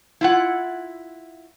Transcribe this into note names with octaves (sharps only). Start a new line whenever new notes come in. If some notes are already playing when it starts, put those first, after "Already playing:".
E4 F4 F#5